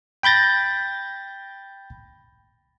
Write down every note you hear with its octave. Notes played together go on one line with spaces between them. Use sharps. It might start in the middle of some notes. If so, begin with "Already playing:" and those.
G5 B5 G6 A6 A#6